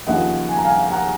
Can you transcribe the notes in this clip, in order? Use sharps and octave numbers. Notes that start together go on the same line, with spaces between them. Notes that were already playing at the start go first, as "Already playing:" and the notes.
D#2 C#3 F3 D#5 F#5
G#5
A#5
F5 G#5
F#5 A#5